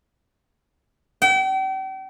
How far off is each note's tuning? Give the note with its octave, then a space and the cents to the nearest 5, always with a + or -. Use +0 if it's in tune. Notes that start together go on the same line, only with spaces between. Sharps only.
G5 -40